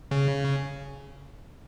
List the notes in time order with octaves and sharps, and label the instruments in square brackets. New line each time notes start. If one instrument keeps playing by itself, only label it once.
[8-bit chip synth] C#3